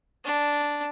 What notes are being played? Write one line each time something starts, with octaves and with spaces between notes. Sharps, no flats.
D4